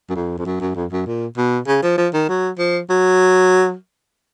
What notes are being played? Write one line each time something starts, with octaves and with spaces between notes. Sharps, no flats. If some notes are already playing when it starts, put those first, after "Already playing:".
F#2
F2
F2
F#2
F#2
F2
F#2
A#2
B2
C#3
F3
F3
D#3
F#3
F3
F#3